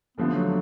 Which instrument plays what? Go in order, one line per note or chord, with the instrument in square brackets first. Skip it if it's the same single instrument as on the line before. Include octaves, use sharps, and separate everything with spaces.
[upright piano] D#2 D3 F3 A3 [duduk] B3
[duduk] F#3